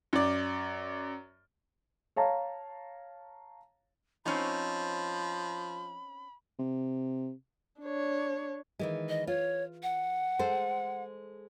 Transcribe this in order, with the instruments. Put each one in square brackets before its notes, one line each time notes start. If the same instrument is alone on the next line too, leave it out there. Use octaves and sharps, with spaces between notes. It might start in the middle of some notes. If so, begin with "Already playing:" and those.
[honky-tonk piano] F#2 D5
[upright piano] C#5 F5 A5 A#5
[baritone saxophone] F3 [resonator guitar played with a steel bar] C4 C#4 D#4 [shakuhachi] B5
[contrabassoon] C3
[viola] D4 C#5
[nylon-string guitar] D#3 E3 G#3
[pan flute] D#5
[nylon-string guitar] F4 [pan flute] C#5
[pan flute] F#5
[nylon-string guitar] G#3 A4 C5